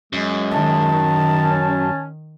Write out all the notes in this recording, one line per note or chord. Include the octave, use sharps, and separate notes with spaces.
F#2 G#3
D#3 A5
C#4